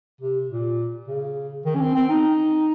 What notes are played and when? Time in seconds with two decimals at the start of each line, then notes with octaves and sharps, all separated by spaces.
0.21 C3
0.49 A#2
1.07 C#3
1.65 D#3
1.75 C#4
1.80 C4
1.95 C4
2.09 D#4